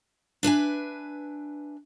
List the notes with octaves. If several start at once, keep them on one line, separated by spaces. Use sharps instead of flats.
D4 B4 E5 G#5